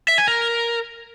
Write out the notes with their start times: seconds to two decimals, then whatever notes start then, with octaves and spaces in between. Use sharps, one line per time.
0.08 E5
0.18 G#5
0.28 A#4